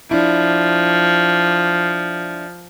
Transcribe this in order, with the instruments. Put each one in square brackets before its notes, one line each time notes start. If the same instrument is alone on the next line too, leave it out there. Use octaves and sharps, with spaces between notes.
[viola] F3 [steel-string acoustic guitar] D4 E4